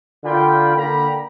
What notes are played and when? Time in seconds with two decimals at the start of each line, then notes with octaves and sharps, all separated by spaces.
0.24 D3 D4 F4 A#4 G5 B5
0.76 D3 A#3 G5 A#5 B5